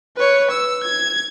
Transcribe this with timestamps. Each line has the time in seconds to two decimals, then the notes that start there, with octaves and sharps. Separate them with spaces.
0.17 B4 C#5
0.51 E6
0.84 G#6